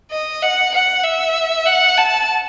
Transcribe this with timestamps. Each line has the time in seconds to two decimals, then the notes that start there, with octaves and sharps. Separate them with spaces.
0.11 D#5
0.43 F#5
0.74 F#5
1.04 E5
1.66 F#5
1.98 A5